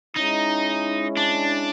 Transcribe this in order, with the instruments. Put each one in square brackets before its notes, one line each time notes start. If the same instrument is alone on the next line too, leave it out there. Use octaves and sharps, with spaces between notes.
[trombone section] G#3 C#4 E4 [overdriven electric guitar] D#4
[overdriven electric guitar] D4